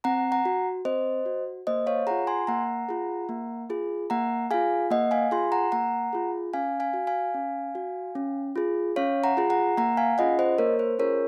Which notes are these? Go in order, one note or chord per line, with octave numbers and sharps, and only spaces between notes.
C4 F#5 A#5
F#5 A#5
F#4
C4 C5 D#5
F#4
A#3 C5 D#5
C#5 F5
F4 G#4 F#5 A#5
G#5 C6
A#3 F#5 A#5
F4 G#4
A#3
F4 G#4
A#3 F#5 A#5
F4 G#4 F5 G#5
A#3 D#5 F#5
F5 G#5
F4 G#4 G#5 C6
F#5 A#5
A#3 F#5 A#5
F4 G#4
C#4 F5 G#5
F5 G#5
F#4
F5 G#5
C#4
F#4
C#4
F4 G#4
C#4 C#5 F5
F#5 A#5
F4 G#4
F#5 A#5
A#3 F#5 A#5
F5 G#5
C#4 F4 G#4 D#5 F#5
C5 D#5
A#3 A#4 C#5
C5
C#4 F4 G#4 A#4 C#5